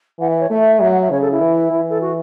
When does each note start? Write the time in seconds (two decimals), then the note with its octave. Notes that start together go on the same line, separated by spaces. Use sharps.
0.20 E3 F#5
0.30 E5
0.40 C#5
0.50 A3 E5
0.80 F#3 E5
0.91 F#5
1.01 E5
1.10 C#3 C#5
1.21 A4
1.31 E4
1.41 E3
1.71 E3
1.89 A4
2.01 F#4